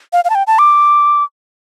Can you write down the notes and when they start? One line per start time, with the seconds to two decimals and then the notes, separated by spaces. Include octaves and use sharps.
0.13 F5
0.25 F5
0.30 A5
0.35 G5
0.47 A5
0.59 D6